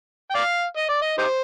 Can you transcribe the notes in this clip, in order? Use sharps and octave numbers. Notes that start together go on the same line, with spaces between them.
G5
D5 F5
D#5
D5
D#5
D#4 G4 C5